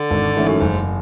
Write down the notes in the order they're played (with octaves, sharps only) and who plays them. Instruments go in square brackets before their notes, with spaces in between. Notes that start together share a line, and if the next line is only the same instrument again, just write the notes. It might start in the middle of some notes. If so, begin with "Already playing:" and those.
Already playing: [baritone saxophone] D3
[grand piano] G#1
G#2 E3 A3 C#4
[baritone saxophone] F#2
[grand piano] F#1 [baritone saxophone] G#2